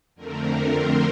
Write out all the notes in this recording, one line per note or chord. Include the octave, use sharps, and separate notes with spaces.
F2 D3 A3 C4 A#4
C5